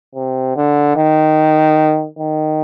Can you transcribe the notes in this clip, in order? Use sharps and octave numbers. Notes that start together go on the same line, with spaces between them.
C3
D3
D#3
D#3